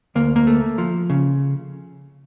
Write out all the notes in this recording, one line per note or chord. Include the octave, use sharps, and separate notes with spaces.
D2 A#3
A#3
A3
F3
C#3